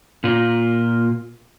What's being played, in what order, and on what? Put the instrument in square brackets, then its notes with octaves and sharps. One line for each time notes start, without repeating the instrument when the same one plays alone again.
[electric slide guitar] A#2 F4